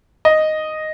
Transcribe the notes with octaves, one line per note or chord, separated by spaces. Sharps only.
D#5